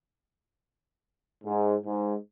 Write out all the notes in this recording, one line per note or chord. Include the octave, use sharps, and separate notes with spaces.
G#2
G#2